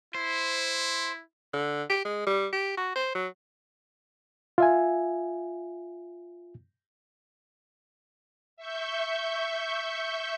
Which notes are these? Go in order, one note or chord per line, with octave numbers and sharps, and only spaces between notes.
E4 C5
D3
G4
G#3
G3
G4
F#4
C5
F#3
F4 E5 G#5
E5 C#6 G6